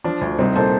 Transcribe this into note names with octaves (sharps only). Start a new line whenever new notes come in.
F3 D4
D2
C2 C4 D#4
A#2 A4 C5